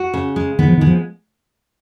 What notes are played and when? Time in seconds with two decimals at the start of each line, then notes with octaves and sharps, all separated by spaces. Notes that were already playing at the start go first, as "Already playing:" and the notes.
Already playing: F#4
0.14 C#3
0.36 G#3
0.59 D#3 B3
0.68 F3
0.78 D#3 G#3
0.87 F3